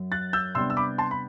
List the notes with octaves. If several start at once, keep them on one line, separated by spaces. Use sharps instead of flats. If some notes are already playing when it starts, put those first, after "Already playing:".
Already playing: F#2 F#3
F#6 A6
E6 G6
C3 G3 B3 D4 C6 E6
E6
B5 D6
A5 C6
B5